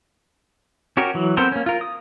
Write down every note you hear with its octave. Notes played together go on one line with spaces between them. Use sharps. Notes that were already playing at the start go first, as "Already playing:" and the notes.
C#4 F#4 G4 A#4
E3 F#3
B3 C4 A4 A#4 C5
A#3 C#4
F4 A#4
D#6